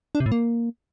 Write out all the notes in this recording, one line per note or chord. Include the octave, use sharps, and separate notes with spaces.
D4
C3
A2
A#3